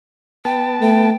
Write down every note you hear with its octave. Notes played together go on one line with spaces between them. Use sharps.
B3 G5 A5
A3 G5